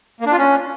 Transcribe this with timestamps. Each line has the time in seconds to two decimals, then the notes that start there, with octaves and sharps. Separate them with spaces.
0.20 A#3
0.26 D4
0.32 F4
0.38 C#4